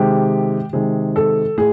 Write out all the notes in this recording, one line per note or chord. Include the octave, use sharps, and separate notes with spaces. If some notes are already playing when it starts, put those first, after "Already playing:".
Already playing: C3 D#3 G#3 G4
C3 D#3 G#3 G#4
A4
A2 G#4